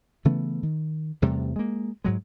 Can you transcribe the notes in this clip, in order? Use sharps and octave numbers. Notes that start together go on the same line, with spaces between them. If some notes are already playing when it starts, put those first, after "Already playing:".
C#3 E3 A3 B3
D#3
E2 C3 G3 A3
G#3 A#3
G#2 F#3 G#3